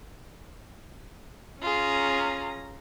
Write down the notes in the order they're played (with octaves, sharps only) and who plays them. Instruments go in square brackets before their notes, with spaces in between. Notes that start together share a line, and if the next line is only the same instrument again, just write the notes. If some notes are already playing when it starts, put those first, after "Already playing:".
[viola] C#4 A#5 [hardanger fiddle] F4 G#4